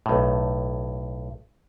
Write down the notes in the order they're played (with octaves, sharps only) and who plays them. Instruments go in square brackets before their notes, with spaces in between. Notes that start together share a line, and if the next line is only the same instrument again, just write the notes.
[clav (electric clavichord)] B1 A2